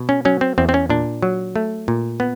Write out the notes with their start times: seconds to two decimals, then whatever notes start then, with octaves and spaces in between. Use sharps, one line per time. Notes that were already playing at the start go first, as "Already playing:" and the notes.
Already playing: B2
0.09 C#4
0.25 F#3 C#4
0.41 C4
0.58 E2 C4
0.69 C4
0.74 C#4
0.90 A#2 D4
1.22 F#3
1.56 A3
1.88 A#2
2.20 B3